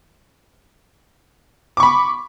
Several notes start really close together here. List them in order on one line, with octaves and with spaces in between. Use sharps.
D6 C#6 B5